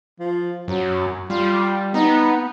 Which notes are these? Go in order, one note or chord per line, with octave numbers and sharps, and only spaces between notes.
F3
F#2 F#3
G3 F4
B3 D#4